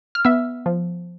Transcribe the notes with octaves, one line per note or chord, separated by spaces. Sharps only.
F6
B3 E5 E6
F3